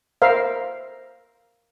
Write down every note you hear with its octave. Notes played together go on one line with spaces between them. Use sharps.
A#4 C5 E5 F5